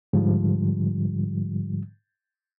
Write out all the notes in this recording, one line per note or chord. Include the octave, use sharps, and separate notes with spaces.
G#2 D3 F3 G3